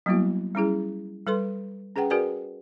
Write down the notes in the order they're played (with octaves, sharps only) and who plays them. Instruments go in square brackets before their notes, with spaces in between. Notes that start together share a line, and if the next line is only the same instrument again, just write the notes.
[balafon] F#3 G3 A#3 B3 E4 F#4
G3 C#4 E4 G#4
G3 A4 B4 C6
C#4 G#4 B4 F#5 G5
F#4 G#4 A#4 B4 D5 G#5